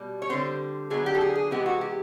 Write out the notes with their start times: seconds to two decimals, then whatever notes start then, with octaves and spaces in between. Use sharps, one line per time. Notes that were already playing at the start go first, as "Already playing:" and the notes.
Already playing: B2 G3
0.22 C#5
0.29 D3 G3 C4 C5
0.90 D3 F#3 B3 D4 G#4
1.06 G4
1.15 A4
1.21 G#4
1.35 G#4
1.51 C3 E3 G#3 B3 G4
1.66 F#4
1.81 G4